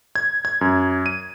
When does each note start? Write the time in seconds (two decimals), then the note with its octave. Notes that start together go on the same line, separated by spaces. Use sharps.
0.15 G#6
0.45 G#6
0.61 F#2
1.06 D#7